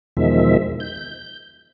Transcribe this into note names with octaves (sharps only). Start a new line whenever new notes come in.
E2 B2 D#3 F3 G#3 E5
G6